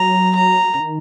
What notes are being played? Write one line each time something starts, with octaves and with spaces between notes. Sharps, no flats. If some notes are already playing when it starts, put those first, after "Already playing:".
Already playing: F#3 A#5
A#5
C#3
D#3